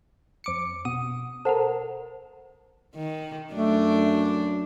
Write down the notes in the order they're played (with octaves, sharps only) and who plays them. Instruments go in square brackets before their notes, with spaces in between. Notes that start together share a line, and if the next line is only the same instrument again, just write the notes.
[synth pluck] F2 D6 C#7
B2 D#6
[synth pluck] A4 A#4 [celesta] C5 F#5 A5
[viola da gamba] D#3
[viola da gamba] F#2 D4 [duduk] A3